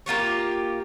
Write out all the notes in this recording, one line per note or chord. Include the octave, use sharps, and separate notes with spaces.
A#3 F4 G4 C#5